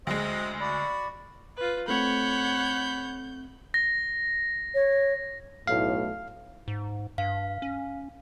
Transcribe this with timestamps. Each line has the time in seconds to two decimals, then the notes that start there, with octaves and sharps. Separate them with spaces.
0.07 D2 G#3 C4 D#5
0.60 F#4 D5 B5
1.57 F4 B4
1.88 A3 C4 C#5 F#5 B5 G6
3.74 A#6
4.74 C#5
5.67 B1 A2 F5
6.68 G#2
7.18 G2 F5
7.62 C#4